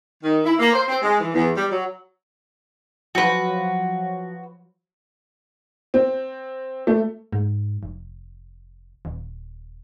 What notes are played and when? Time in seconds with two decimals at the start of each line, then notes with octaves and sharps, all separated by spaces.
0.22 D#3
0.45 E4
0.58 A#3
0.73 C5
0.88 C4
1.02 G#3
1.20 E3
1.33 E2
1.56 G3
1.70 F#3
3.15 F3 F#3 F#4 B4
5.94 C4
6.87 A3
7.33 G#2
7.83 F1
9.05 D#1